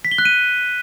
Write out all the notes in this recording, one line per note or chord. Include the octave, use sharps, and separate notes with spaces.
B6
G7
F#6
D#7